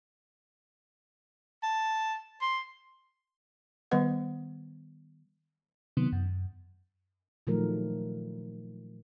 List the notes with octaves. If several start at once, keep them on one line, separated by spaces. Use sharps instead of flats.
A5
C6
D#3 G3 B3 B4 F#5
C3 D#3 F#3 B3
F#2
A#2 D#3 F3 F#3 A3 A#4